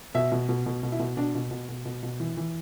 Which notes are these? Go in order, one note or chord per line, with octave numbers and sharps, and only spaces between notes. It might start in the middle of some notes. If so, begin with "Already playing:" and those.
B2 E5
B2
B2
B2
B2
E4
B2
B2 D4
B2
B2
B2
B2
B2
E3
E3